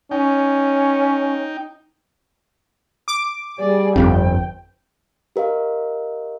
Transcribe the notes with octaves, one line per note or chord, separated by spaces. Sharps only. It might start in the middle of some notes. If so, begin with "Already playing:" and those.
C#4 D#4 G5
D6
G3 G#4 D5
G1 F2 G5
G4 A#4 D#5 F5